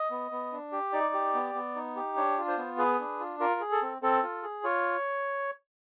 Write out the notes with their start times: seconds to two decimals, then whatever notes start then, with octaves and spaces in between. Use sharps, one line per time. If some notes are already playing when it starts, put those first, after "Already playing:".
Already playing: D#5
0.11 B3
0.31 B3
0.52 D4
0.72 G4
0.93 D#4 D5
1.14 G4
1.34 B3
1.55 B3
1.75 D#4
1.96 G4
2.16 D4 C#5
2.38 F4
2.48 C5
2.58 B3
2.78 G#4 B4
2.99 D4
3.20 F4
3.40 F4 A#4
3.60 G#4
3.71 A4
3.82 C4
4.02 C4 A4
4.23 F4
4.43 G#4
4.64 F4 C#5